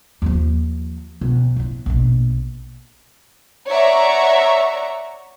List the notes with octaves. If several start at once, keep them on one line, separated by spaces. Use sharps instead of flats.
D#2 F3
B1
A1 E4
A#1 B2
C#5 D5 E5 F#5 A#5 C#6